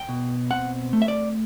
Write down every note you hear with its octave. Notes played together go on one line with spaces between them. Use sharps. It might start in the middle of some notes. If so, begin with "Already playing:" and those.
Already playing: G5
B2
C4 F#5
A3
E5
D5